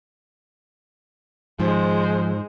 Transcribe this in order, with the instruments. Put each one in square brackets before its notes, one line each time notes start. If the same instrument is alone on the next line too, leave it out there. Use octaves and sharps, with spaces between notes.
[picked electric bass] G#2 [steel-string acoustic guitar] D#3 F3 [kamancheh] G#3 C5